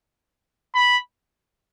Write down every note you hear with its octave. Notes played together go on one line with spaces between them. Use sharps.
B5